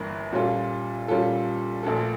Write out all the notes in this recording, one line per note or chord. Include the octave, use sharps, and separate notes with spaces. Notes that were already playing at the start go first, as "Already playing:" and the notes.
Already playing: G1 G2 E3 A#3 D4
A#2 G3 C#4 F4 A4
A#2 G3 C#4 F4 A4
A#1 A#2 A3 D4 A4